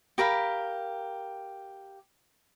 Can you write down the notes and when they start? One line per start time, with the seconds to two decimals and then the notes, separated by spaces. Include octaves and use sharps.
0.18 G4 A#4 F5 B5